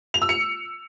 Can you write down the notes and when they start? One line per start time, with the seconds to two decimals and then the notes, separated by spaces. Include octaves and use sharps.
0.14 F7
0.22 E6
0.29 C#7